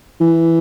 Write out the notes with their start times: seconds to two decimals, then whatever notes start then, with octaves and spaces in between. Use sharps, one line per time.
0.20 E3